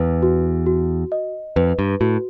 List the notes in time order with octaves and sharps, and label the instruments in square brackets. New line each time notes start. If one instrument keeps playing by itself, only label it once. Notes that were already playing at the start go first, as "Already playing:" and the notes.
Already playing: [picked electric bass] E2 [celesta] B4
[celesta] F#4
F#4
D#5
[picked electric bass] F2 [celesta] B4
[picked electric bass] G2
[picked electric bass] A2 [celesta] F#4